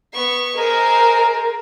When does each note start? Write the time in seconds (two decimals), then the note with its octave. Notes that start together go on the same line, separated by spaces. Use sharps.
0.13 B3 C#6
0.55 G#3 A#4 C5